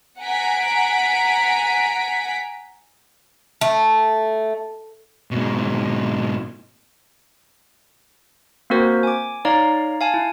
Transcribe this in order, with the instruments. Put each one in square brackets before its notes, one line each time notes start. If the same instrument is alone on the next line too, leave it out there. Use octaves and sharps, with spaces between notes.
[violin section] F#5 G#5 A#5 B6 D7
[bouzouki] A3
[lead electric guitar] G#2 B2
[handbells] A#3 C4 F#4 A#4 C5
G#5 D6
D#4 C#5 D5 F5 A#5
F5 G#5 A5
E4